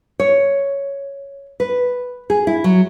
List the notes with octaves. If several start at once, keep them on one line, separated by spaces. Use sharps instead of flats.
C#5
B4
G#4
E4
F#3